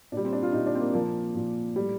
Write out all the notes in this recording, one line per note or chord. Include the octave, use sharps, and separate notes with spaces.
A#2 G3 D4
C4
D4
F4
A#2 G3 D#4
D4
C4
A#3
A#2 F3 A#3
A#2 F3
A2 G3